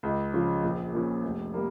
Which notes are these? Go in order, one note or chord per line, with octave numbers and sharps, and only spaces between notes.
C#2
C#3 F3 C#4 F4
A#1
A#2 F3 C#4
F1
G3 A#3